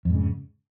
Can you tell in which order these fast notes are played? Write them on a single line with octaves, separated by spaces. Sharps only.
F2 G#2 C#3